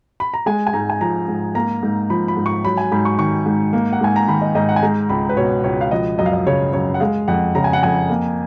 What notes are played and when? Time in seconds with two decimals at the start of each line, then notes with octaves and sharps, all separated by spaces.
0.20 B5
0.34 A#5
0.46 G#3 G#5
0.67 G#5
0.73 G#2 A#5
0.90 G#5
1.01 F3 A#5
1.28 G#2
1.55 A#3 A#5
1.83 G#2
2.10 F3 B5
2.28 B5
2.37 G#2
2.46 C#6
2.64 F#3 B5
2.78 G#5
2.92 G#2 B5
3.05 C#6
3.18 D#3 C#6
3.46 G#2
3.73 A#3
3.93 F#5
4.01 G#2 G#5
4.16 A#5
4.28 D#3 B5
4.42 D#5
4.55 G#2 D#5
4.69 F#5
4.76 G#5
4.83 G#3 A#5
5.09 C#2 B5
5.29 B4
5.37 B2 C#5
5.64 C#2 C#5
5.81 F5
5.91 F3 D#5
6.18 F#2 D#5
6.26 F5
6.33 D#5
6.46 C#3 C#5
6.73 F#2 C#5
6.94 F#5
7.00 G#3 F5
7.28 F2 F#5
7.55 C#3 A#5
7.64 G#5
7.73 F#5
7.83 F2 G#5
8.09 A#3